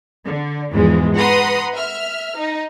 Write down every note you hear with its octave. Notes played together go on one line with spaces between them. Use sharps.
D3
E2 G#2 E3 F3 G#3
B4 F#5 A#5 C6 D#6
E5 F6
D#4